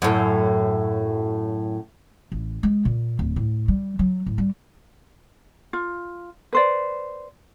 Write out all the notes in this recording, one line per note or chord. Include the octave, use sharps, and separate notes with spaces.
F#2 A2
A1
G#3
A#2
D1
A2
G3
F#3
A2
G3
F4
B4 C5 D5